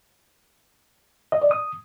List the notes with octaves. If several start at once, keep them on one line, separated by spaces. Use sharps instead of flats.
D#5
D5
D#6